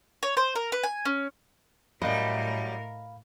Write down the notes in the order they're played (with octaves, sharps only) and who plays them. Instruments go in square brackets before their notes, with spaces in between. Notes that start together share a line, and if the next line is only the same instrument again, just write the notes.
[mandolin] C#5
C5
A#4
B4
G#5
C#4
[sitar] F#2 G3 [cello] A2 A#4 [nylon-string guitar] D#5 [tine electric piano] F5 B5